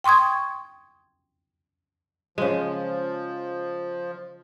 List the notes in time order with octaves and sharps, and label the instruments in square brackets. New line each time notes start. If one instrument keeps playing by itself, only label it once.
[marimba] G5 C6 C#6 D#6 G#6
[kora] C#3 G#3 [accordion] F3